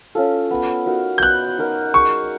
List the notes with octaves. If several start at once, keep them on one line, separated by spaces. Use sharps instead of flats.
C#4 F4 A4
B3
D#4 F#4 A#4
G6
B3 F#6
D#4 F#4 A#4
G#3 C#6